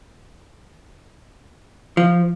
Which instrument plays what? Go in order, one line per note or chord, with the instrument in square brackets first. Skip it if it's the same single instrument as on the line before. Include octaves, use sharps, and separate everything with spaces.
[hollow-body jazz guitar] F3